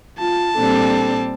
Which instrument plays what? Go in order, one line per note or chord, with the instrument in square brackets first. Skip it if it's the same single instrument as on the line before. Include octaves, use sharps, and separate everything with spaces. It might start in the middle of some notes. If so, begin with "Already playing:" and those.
[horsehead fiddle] F4 [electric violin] A5
[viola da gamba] A#2 G3 C4 [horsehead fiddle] D4 A4